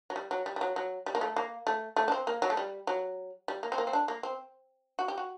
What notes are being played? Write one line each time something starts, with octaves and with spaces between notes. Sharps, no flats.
F#3
G3
F#3
G3
G3
F#3
F#3
G3
A#3
A3
A#3
A3
A3
D4
C4
A#3
F#3
A3
G3
F#3
G3
A#3
C4
A#3
C4
D4
A#3
C4
F#4
G4
F#4